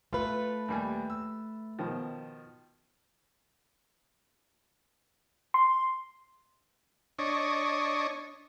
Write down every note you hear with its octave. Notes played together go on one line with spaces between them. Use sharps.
A3 F4 A4 B4
D#2 G3 G#5
E6
B2 D#3 F3
C6
D4 C#5 D#5